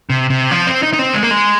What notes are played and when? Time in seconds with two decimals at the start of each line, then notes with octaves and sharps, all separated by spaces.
0.10 C3
0.30 C3
0.51 F3
0.67 C4
0.83 D#4
0.93 D#4
0.99 C4
1.14 G#3
1.23 A#3
1.31 G#3